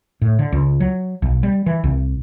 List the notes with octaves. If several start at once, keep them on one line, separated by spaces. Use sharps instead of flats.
A2
D3
C#2
F#3
B1
G3
E3
C2